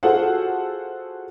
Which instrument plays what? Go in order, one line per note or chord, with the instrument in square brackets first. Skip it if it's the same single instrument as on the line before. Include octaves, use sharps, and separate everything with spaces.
[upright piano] F4 F#4 G#4 A4 C5 F#5